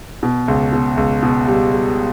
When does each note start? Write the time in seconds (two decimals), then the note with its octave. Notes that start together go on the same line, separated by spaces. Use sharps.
0.23 B2
0.48 C#2
0.72 B2
0.97 C#2
1.23 B2
1.48 G3
1.72 G3